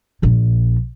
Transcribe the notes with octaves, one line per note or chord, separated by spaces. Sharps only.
A#1 A#2